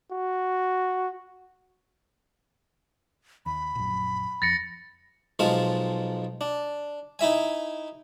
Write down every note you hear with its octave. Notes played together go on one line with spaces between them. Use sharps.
F#4
D#2 B5
A#1 F#2
F2 A6 A#6 C#7
B1 F3 G#3 F5 A5
D4
D#4 E4 E5 G#5